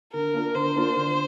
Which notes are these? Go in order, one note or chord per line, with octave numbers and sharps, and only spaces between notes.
D3 A#4
A#3 D4 F4
D3 C5
A#3 D4 F4
D3